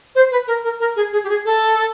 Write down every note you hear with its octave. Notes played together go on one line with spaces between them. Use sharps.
C5
B4
A#4
A#4
A#4
G#4
G#4
G4
G#4
A4